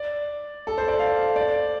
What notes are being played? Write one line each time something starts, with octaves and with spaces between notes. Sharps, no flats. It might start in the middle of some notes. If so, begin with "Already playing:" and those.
Already playing: D5
A4
C5
D5
F5
D5